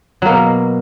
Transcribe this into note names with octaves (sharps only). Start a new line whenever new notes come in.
B2 F#3 A#3